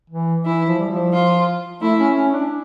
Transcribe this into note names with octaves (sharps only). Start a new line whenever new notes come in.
E3
E3 E4
F3
G3
F3
F4
A3 E4
C#4
C#4
D4